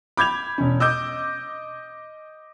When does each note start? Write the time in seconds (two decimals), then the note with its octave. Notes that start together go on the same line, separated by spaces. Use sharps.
0.17 B5 D6 G6 G#6 F7
0.58 E1 C#4
0.80 D#5 D6 E6 G6